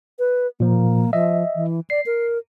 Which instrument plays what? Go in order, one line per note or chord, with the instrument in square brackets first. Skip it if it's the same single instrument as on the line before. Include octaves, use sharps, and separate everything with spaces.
[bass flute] B4
[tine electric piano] A#2 F3 [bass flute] A#3
[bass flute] F3 [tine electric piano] D#5 E5
[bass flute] E3
[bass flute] D5 [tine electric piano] C7
[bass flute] A#4